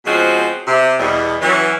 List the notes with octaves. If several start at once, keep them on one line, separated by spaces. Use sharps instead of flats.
B2 F3 G#3 C4 C#4 F#4
C3
E2 B2 G3
E3 F#3 C#4